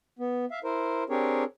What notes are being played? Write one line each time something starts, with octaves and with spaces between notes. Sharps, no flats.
B3
E5 F5
E4 A#4 C5
C4 D4 G4 G#4 A#4 C#5